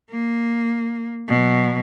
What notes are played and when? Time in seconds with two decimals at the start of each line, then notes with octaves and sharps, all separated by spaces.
0.11 A#3
1.28 B2 F#3